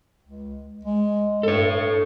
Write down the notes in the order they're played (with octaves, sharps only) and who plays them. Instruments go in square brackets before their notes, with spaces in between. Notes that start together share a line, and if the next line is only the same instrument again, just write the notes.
[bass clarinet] C#2
G#3
[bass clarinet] G2 [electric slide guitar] A4 C#5